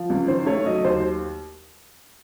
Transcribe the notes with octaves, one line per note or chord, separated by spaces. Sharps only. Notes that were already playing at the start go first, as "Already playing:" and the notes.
Already playing: F3
C#2
D#3 C5
A3 C#5
F#3 D#5
D#2 C5